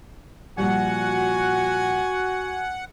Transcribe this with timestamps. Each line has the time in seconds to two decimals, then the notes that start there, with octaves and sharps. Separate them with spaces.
0.58 A#2 F3 G3 F#4 F#5 G#5